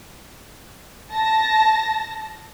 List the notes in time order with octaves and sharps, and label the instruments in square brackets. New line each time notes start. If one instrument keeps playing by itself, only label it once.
[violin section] A5 A#6